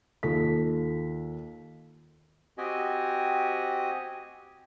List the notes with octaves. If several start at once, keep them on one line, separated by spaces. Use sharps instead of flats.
D#2 F4 A4 B6
C4 F#4 G4 D#5 G#5